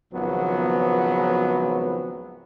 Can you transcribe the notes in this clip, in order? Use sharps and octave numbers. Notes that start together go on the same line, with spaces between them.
G#1 C#2 F3 F#3 B3